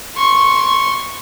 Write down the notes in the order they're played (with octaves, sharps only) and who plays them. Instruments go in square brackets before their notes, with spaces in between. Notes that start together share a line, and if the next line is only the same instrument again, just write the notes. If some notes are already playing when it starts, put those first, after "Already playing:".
[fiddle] C6 C#6